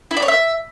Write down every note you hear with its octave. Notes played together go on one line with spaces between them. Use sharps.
E4
D5
C#5
E5